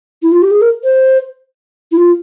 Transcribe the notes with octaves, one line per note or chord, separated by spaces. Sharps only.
E4
F4
G4
G#4
A#4
C5
E4
F4